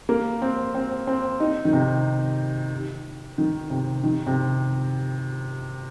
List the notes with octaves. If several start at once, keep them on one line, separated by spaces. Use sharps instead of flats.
A#3
C4
C4
C4
D#4
D#3
C3
D#3
C3
D#3
C3